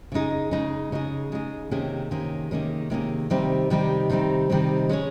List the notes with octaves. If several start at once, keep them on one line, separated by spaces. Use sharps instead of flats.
C#3 G#3 D#4 G#4
C#3 G#3 D#4 G#4
C#3 G#3 D#4 G#4
C#3 G#3 D#4 G#4
C3 D#3 A#3 C#4 G#4
C3 D#3 A#3 C#4 G#4
C3 D#3 A#3 C#4 G#4
C3 D#3 A#3 C#4 G#4
C3 D#3 G3 C4 D#4
C3 D#3 G3 C4 D#4
C3 D#3 G3 C4 D#4
C3 D#3 G3 C4 D#4
G#3 C#4 G#4 C#5